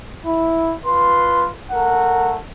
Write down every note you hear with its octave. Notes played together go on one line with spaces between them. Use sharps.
E4
F4 B4 C6
A3 A#4 F#5